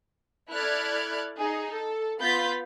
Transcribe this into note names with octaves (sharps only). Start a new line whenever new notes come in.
E4 A4 D5 F6 F#6 G#6
D#4 G#4
A4
B3 F4 B5 G6 A6 B6